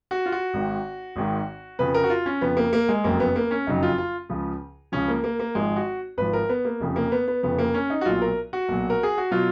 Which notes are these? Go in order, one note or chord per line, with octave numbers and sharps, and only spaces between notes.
F#4
F4
F#4
G#1 G#2 D#3
G#1 G#2 D#3
F2 C#3 F3 B4
A#4
F#4
F4
C#4
F2 C#3 F3 B3
A#3
A#3
G#3
F#1 F2 C#3 F#3 A#3
B3
A#3
C#4
F#1 F2 C#3 F#3 D#4
F4
F4
C#2 C#3 F3
C#2 C#3 F3 C#4
A#3
A#3
A#3
G#1 G#2 F3 G#3
F#4
G#1 G#2 F3 B4
A#4
B3
A#3
F1 F2 C#3 F3
A#3
B3
B3
F1 F2 C#3 F3 B3
A#3
C#4
D#4
F#4
B1 A#2 F#3 F4
A#4
F#4
B1 A#2 F#3
A#4
G#4
F#4
B2 F#3 F4